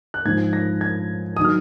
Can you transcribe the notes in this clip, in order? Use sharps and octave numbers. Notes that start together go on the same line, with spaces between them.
F#6
G#2 F3 G#6
A#6
G#6
D#6
D#3 F#3 F6